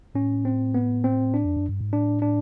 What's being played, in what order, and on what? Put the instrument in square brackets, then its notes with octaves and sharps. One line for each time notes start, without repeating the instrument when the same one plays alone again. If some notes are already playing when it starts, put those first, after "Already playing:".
[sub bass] A2 [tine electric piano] C#4
[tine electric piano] C4
B3
C4
D4
[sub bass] F2
F#2
G2
G#2
[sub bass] A2 [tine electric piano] D4
[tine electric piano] D4